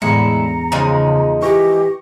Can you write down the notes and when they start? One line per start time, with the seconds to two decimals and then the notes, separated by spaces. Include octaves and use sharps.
0.02 E2 A2 D3 G#3 E4 A#5 C#7
0.72 C#3 F3 G#3 D#4
1.42 E3 G4 C#6 A#6